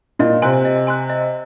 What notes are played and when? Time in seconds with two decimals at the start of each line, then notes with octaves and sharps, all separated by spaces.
0.19 A#2 D#5
0.42 C3 G#5 C6 F#6
0.65 D#5
0.87 G#5 C6 F#6
1.10 D#5